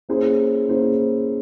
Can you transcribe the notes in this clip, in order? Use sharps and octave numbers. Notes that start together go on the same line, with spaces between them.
A#3 C#4 E4 G#4 C5
A#3 C#4 E4 G#4 C5